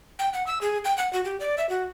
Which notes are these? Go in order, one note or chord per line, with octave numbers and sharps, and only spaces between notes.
G5
F#5
E6
G#4
G5
F#5
F#4
G4
D5
E5
F#4